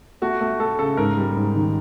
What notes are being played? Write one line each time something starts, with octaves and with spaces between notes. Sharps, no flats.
A3 F#4
A3
A3 A4
C#3 A4
G#2 A#4
G3
G#2
D#3